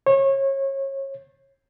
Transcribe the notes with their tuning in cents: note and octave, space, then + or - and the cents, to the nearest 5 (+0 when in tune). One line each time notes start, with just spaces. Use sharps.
C#5 -30